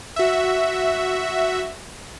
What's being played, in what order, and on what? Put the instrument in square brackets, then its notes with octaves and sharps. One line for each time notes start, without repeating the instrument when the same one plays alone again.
[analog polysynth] F#4 E5